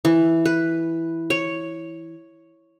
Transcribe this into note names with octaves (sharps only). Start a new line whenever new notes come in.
E3
B4
C#5